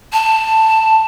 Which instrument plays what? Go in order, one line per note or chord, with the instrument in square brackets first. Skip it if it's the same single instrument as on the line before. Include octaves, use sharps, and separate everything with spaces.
[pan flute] A5